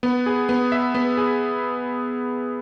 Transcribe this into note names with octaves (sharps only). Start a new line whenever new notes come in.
B3
G#4
B3
E5
B3
G#4